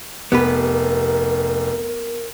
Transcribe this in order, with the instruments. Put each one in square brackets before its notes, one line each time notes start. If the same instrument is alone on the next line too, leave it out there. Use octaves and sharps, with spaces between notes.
[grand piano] F1 [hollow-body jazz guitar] B3 G4 B4 [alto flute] A#4